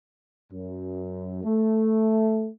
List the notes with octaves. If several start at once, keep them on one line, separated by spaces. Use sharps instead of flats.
F#2
A3